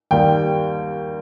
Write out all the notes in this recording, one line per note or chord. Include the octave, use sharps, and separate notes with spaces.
D#2 D#3 G3 G5